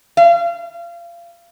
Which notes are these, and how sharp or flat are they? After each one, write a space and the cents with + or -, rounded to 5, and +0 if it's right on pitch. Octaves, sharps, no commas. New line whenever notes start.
F5 -30